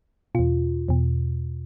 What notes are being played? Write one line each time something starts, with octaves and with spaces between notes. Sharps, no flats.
E2 B2 F4
E2 B2